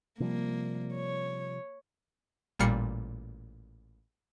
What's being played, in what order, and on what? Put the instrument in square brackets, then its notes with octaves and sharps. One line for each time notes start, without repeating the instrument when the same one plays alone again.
[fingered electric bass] C3 F3 G3 [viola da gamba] A#3
[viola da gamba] C#5
[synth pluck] A1 A#2 G3 F6 C7 C#7